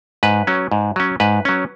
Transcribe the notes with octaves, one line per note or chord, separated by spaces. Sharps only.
G#2 B4
F#3 C#4
G#2
F#3 C#4
G#2 B4
F#3 C#4